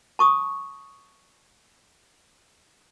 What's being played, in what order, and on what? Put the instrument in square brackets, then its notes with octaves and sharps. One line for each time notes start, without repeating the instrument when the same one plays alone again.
[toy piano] A5 C#6 D#6